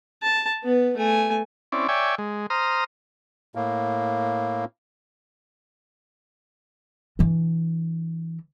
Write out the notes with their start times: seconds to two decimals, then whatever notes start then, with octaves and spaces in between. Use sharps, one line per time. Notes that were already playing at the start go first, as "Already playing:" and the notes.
0.22 A5
0.64 B3 B4
0.97 A3 G#5
1.72 C4 C#4 E4 D5
1.88 C#5 D5 E5 G5 G#5
2.18 G#3
2.50 C5 A#5 D#6 F6
3.55 A2 A#3
7.19 E3 D4